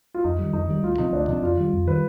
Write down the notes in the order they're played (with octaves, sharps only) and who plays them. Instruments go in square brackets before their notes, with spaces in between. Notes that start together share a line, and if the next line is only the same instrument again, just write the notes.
[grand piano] F4
[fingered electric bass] F2 [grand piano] D#4
[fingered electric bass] D#3 G3
[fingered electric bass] F2 [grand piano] D#4
[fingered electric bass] D#3 G3
[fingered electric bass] D2 [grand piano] F4
[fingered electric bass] C3 F3 C4 [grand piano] D#4
[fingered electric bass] D2 [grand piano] D4
[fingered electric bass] C3 F3 C4 [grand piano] D#4
[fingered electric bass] F2 [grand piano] F4
[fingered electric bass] D#3 G3
F2
[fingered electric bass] D#3 G3 [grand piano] B4